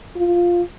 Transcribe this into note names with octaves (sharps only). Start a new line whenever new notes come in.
F4